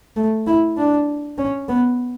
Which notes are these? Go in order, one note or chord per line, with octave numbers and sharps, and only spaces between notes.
A3
E4
D4
C#4
B3